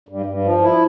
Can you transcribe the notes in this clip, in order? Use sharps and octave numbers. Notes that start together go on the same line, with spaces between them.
G2
G2
F3
E4